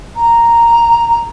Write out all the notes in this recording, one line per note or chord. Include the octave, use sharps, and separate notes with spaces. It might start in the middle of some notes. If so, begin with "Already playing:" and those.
A#5